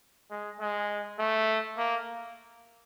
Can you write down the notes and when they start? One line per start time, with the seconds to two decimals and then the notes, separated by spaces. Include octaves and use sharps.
0.31 G#3
0.60 G#3
1.19 A3
1.77 A#3